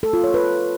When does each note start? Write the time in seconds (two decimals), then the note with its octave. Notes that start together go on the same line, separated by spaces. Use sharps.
0.03 A4
0.13 F4
0.24 C#5
0.34 B4